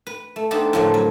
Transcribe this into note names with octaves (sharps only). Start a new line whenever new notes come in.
B4
A3
B3 D4 D#4 G4 A4 C5
A2 D3 F3 A3 A#3
F#3